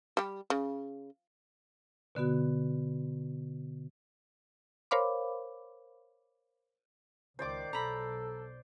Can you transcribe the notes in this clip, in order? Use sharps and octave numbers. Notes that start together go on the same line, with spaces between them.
G3 G4
C#3
B2 D3 B3 F#4
A#4 C5 C#5 F5 B5 D6
C#2 D#3 C5 D5 D6
B1 A4 A#5 B5